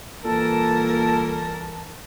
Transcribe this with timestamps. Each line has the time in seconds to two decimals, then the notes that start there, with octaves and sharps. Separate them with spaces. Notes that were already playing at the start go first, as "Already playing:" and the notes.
0.25 C2 A#2 E3 A4 A#4 A5